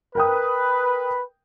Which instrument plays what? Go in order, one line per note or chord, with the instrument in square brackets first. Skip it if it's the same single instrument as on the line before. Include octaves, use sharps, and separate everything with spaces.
[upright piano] A#4 G5 D#6 [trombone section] B4